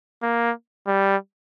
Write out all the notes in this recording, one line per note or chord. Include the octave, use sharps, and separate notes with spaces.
A#3
G3